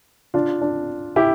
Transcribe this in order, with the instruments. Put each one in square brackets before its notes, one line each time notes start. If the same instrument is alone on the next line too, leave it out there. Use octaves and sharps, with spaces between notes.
[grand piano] D4 F4
D4
E4 G4